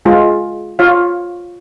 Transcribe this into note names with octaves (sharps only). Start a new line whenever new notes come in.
G#3 F4 G#4
F4 C#5 F5